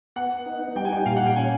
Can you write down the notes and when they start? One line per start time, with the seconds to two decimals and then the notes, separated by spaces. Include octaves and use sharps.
0.16 B3 F#5
0.46 D#4
0.75 G3 G5
0.85 G#5
0.93 G5
1.06 A#2 F5
1.16 F#5
1.26 G5
1.36 C#4 G#5